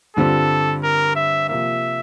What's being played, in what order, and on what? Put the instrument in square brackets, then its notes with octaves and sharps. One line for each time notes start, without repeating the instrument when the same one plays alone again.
[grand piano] G2 D3 G3 C4 F4 [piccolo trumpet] A4
[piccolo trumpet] A#4
E5
[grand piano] C3 F3 A#3 [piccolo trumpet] E5